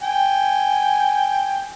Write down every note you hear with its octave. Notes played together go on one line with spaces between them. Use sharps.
G5 G#5